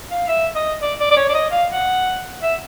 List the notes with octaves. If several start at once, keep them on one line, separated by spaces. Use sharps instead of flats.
F5
E5
D#5
D5
D5
D5
C#5
D5
D#5
F5
F#5
E5